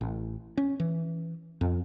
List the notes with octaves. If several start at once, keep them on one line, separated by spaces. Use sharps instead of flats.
A1
C#4
E3
F2